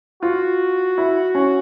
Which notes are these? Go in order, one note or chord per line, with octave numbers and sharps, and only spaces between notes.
F4 F#4
E4
C#4